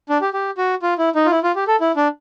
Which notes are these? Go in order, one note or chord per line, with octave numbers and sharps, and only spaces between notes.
D4
G4
G4
F#4
F4
E4
D#4
F4
E4
F4
G4
A4
E4
D4